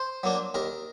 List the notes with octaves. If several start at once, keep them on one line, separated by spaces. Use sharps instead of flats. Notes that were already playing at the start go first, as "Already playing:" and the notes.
Already playing: C5
F#3 A#3 D4
D#2 A#4